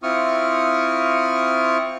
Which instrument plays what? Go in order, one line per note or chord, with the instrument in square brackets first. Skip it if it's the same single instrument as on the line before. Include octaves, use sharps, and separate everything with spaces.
[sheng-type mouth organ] C4 E4 F4 C#6 D#6 F6